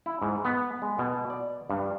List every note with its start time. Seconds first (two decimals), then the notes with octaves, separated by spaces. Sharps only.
0.06 E4
0.22 G#2
0.45 B3
0.82 G#3
0.99 B2
1.30 D5
1.70 G2